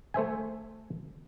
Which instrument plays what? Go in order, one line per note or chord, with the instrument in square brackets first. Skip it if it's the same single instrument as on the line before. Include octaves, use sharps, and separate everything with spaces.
[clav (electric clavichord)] A3 C5 E5 G#5